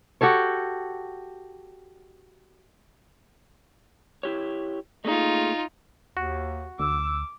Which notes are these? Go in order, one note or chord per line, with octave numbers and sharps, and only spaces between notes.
F#4 G4 A4 C#5
E4 G4 C#5
A3 A#3 D#4 F4 G#4
D#2 F#4
D2 D6 E6